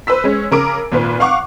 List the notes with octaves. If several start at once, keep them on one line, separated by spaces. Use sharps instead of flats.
B4 C5 E6 B6
G#3 C#4
C#3 A#4 D6 D7
G#1 A#2 B4
F5 F#5 C#6 D6